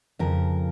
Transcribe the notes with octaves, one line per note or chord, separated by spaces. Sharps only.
F2 C#3 F3 A#4